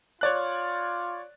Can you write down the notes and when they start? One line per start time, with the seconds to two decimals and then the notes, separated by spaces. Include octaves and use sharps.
0.21 F4 C#5 D5 F#6